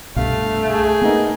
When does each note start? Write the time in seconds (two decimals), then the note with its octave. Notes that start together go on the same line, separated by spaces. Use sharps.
0.16 C2 G2 B2 A3 F5
0.69 G#4
1.01 A#3 B3 D#4 A#4